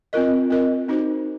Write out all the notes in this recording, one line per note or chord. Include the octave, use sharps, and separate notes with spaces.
C4 F4 A#4 D#5
C4 F4 A#4 D#5
C4 D#4 F#4 C5